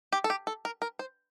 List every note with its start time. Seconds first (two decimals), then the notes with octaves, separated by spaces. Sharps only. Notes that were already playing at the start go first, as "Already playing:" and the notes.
0.12 G4
0.24 A4
0.30 G4
0.47 A4
0.65 A#4
0.82 A#4
0.99 C5